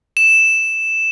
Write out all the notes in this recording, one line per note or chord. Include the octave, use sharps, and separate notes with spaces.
E7